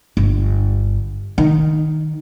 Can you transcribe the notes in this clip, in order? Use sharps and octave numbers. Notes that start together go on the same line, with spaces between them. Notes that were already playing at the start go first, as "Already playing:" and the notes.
G1
D#3